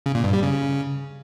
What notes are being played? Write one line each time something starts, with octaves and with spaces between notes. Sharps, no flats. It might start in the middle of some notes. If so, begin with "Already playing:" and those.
C#3
A#2
G2
G3
C#3